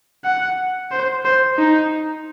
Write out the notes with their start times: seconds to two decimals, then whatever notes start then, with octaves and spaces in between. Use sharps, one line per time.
0.25 F#5
0.91 C5
1.25 C5
1.58 D#4